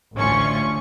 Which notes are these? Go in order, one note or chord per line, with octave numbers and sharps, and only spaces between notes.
A1 D2 C#4 F4 C#6